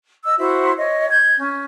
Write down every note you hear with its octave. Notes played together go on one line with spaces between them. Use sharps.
D#5 E6
E4 F#4 C5 E5
C#5 D#5
G6 G#6
C#4